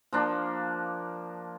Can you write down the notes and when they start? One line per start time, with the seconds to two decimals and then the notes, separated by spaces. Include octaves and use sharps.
0.13 F3 A#3 D4